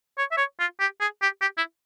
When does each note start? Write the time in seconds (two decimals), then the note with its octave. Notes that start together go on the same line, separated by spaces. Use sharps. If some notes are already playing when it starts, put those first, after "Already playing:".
0.18 C#5
0.31 E5
0.38 C#5
0.60 F4
0.80 G4
1.00 G#4
1.22 G4
1.42 G4
1.58 E4